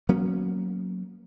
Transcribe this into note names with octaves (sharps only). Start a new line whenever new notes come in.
F#3 A#3 B3 C#4